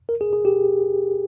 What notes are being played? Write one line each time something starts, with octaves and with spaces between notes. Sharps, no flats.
A#4
G#4
G#4
G4